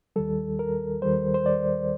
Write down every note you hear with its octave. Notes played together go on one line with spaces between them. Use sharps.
D#2 D#3 G3 A4
A#4
D#2 D#3 G3 C5
C5
D5